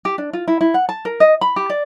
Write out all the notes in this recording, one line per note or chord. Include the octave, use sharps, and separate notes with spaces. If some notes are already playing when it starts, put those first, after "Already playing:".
G4
D4
F4
E4
E4
F#5
A5
A#4
D#5
B5
G4
D5